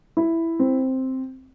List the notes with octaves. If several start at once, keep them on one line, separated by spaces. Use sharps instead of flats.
E4
C4